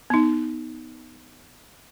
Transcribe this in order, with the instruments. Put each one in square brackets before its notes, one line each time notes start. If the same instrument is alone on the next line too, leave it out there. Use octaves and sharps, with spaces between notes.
[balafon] B3 D#4